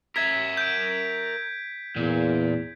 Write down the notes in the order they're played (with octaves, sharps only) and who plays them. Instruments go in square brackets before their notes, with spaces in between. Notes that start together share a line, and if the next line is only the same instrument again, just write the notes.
[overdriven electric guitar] A#4 E5 [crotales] G#6 B6
[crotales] G6 D7
[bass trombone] E2 [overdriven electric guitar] A#2